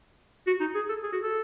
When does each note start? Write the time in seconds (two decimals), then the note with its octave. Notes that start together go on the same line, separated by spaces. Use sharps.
0.47 F#4
0.60 D#4
0.75 G#4
0.89 A4
1.03 G#4
1.12 F#4
1.23 A4